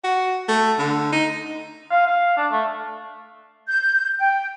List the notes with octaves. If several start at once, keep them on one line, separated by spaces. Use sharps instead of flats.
F#4
A3
D3
D#4
F5
F5
D4
A3
G6
G5